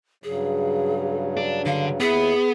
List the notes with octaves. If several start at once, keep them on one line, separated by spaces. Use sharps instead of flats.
G2 C#3 F#3 G#4
D4
D3 F5
D#2 B3 E4 G#4